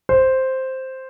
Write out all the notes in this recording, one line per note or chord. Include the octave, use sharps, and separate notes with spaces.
C5